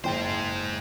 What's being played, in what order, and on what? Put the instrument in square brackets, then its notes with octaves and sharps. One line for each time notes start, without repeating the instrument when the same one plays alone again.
[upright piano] F#1 G5 [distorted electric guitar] G#2 C5